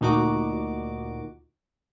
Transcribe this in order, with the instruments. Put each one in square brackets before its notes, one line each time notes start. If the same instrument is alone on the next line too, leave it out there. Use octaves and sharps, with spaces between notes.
[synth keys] D2 A#2 D#4 F#4 D6